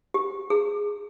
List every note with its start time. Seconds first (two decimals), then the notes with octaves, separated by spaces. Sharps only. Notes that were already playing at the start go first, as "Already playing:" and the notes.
0.14 G4
0.50 G#4